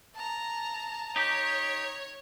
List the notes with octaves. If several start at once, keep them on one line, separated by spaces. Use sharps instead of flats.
A5 A#5
D#4 G4 C#5